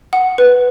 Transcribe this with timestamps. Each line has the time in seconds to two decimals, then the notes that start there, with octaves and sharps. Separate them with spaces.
0.13 F#5
0.38 B4